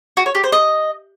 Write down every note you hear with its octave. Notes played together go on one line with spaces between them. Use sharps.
F#4
C#5
G4
C5
D#5